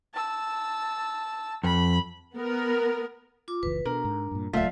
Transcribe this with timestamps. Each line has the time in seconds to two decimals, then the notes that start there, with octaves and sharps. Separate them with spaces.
0.14 A5 E6
1.63 F2 B5
2.36 B3 A#4
3.48 F4 D6
3.63 F#1 C#2 E3 B4
3.86 B2 D4 A#4
4.05 G#2
4.31 G2 A#2
4.53 D#1 C#2 F#3 A3 F4 D5 E5 F#5